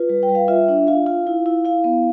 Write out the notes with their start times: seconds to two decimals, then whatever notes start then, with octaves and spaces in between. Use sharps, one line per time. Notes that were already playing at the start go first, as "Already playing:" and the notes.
Already playing: F4 B4
0.09 G3
0.23 G5
0.29 G3
0.35 F5
0.48 F4 E5
0.68 D4
0.87 F4 F5
1.06 F4
1.27 E4
1.46 E4
1.65 E4 F5
1.84 B3